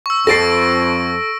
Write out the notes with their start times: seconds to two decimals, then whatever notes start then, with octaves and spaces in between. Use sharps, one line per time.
0.06 C#6 E6
0.27 F2 A4 A6 A#6 C7 D7